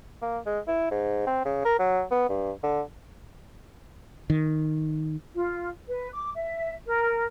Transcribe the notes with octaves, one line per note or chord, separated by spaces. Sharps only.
A#3
G#3
E4
G#2
C4
C#3
A#4
F#3
B3
G2
D3
D#3
F4
B4
D6
E5
A#4